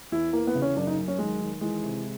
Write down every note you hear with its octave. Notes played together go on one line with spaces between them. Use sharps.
E2 E4
E3 A#3
B3
C#3
C#4
F#2 D4
D#4
F#2
C#4
D#3 G#3
D#3
E3 G#3
C3